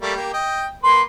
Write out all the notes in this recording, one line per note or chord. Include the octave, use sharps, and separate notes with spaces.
G3 A3 A#3
A#3 G4
D#5 G5
A#3 B4 C6